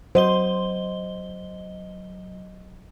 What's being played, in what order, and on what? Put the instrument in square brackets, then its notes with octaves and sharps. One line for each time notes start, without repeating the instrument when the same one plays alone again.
[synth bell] F#3 D#5 G7 [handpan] C5